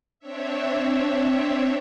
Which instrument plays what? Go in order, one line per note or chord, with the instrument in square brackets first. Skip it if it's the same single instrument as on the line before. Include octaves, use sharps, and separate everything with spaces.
[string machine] C4 D4 C#5 E5